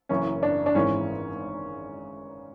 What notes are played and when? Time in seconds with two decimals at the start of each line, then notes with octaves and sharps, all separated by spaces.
0.09 F#1 F#2 E3 C#4
0.43 D4
0.66 D4
0.75 G#1 G#2 E3 C#4